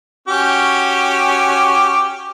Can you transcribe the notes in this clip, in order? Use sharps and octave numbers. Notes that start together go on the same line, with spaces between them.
C#4 F#4 G4